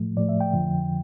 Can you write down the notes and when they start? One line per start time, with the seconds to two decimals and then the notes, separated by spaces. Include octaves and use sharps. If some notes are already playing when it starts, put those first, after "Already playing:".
Already playing: A2 F3 A3
0.17 A2 F3 A3 D5
0.29 E5
0.41 G5
0.53 F2 D3 F3